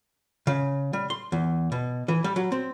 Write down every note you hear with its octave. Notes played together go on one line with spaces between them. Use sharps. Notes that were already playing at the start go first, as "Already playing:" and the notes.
C#3
G3
C6
E2
B2
E3
G3
F#3
C4